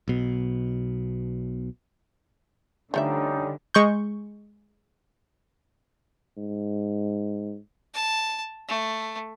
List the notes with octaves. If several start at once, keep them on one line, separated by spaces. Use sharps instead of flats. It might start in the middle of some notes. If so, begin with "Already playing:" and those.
B1 B2
D3 F3 G3 A3 C#4 D#4 E5
G#3 C#6 G6
G#2
A5
A3